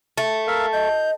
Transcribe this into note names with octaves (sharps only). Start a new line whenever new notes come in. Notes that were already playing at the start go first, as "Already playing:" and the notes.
A3
A#4 E5 F5
D#5 G6